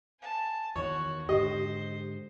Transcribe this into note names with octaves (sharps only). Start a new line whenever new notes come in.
G#5 A5
E2 D#3 B3 F#4 C#5
G#2 D3 G4 C5 D#5